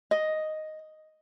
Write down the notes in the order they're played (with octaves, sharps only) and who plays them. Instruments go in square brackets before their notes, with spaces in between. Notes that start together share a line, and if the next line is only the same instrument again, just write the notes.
[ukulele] D#5